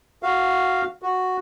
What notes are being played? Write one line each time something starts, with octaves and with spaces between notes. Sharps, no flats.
F#4 F5
F#4